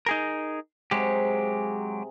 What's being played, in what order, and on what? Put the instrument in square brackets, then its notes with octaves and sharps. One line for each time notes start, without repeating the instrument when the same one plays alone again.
[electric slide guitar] D#4 G#4 A#4
[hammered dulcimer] C3 G#4 F#5 [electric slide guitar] F#3 G#3 G4